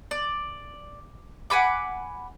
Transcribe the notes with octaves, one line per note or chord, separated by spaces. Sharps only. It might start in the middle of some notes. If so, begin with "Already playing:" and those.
D5
F#5 G#5 B5 D6